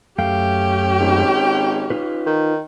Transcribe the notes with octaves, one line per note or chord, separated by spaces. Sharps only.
F#2 A3 C#4 G4 F5 G5
G#1
D#4 F4 B4
D#3